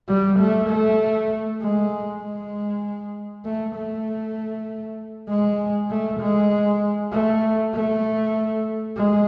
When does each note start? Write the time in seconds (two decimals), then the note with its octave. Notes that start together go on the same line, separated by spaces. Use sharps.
0.09 G3
0.39 A3
0.69 A3
1.62 G#3
2.23 G#3
3.46 A3
3.76 A3
5.29 G#3
5.90 A3
6.21 G#3
7.13 A3
7.74 A3
8.97 G#3